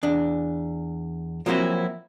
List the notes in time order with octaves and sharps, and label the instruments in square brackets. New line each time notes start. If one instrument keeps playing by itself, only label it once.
[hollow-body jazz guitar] E2 D4
F3 F#3 A#3 C4 E4 F#4